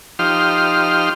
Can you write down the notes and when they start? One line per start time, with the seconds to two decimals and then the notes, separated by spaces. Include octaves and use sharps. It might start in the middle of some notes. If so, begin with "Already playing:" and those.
0.19 F3 D#4 G4 C6 F6